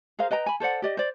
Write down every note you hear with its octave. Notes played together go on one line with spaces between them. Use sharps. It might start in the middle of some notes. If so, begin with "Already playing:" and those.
G#4 A#4 C5 F5
B4 D#5 G5 A#5
G#5 B5
A4 C5 D5 F#5
G4 D5 D#5
C5 D5